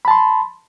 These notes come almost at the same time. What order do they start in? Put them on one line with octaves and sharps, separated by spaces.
B5 A5 C6